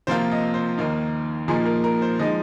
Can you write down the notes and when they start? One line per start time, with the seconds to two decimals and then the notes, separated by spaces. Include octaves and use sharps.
0.07 C3 F3 A#3 F4 C5
0.32 D#5
0.54 C5
0.78 D#2 D#3 A#3 D#4
1.48 A#2 F3 A#3 D#4 G#4
1.66 A#4
1.84 A#4
2.02 C5
2.19 F3 G#3 D#4 D#5